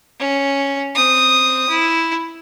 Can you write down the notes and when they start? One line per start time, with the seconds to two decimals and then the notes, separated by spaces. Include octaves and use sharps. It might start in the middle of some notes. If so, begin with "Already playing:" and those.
0.19 C#4
0.95 C4 D#6
1.69 E4